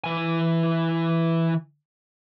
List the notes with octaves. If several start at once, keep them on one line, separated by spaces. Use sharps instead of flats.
E3 G#5